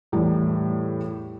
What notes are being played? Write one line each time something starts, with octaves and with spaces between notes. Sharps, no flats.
E2 A2 G3